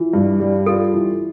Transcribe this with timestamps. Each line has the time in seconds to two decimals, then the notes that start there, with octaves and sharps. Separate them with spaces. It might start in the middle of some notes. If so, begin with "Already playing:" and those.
Already playing: E3 F4
0.13 G2
0.40 G3
0.66 F4 A4
0.94 E3